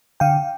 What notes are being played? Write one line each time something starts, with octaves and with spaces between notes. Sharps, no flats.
D3 F5 G5